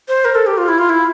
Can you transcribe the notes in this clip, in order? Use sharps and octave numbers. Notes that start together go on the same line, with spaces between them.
C5
A#4
A4
G4
F4
E4
F4
E4